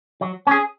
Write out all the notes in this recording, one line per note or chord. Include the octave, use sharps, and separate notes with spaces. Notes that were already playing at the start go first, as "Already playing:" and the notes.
F#3
C#4 G#4